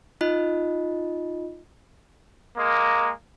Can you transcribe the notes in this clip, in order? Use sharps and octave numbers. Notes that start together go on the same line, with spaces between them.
D#4 F4 D#5
G#3 A#3